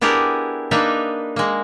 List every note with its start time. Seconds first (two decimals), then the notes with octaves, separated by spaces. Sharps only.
0.01 B3 D4 E4 G4 G#4 A#4
0.71 A#3 D4 D#4 B4 E5
1.36 G#3 A#3